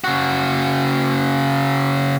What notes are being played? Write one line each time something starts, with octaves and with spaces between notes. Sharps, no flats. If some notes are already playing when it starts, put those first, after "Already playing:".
C#3 F#4